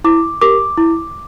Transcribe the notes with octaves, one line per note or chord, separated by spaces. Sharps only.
E4 D6
G4 A#4 D6
E4